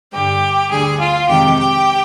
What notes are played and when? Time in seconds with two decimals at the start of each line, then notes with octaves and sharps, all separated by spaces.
0.12 G2 D3 G3 G4 G5
0.70 D2 D3 G3 G#4 G#5
0.99 F4 F5
1.28 F2 C3 D#3 G#3 G4 G5
1.57 G4 G5